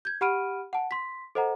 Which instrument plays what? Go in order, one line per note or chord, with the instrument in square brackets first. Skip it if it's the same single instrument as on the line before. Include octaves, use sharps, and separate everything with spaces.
[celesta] G6 G#6
G4 F#5 B5 F6 D7 D#7
F#5 A5
C6 B6
A4 C5 D#5 F#5 A#5